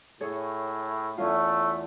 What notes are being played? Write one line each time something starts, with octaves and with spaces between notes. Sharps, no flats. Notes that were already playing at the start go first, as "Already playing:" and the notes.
A2 G#4 A4 C#5
E2 A3 C#4 F4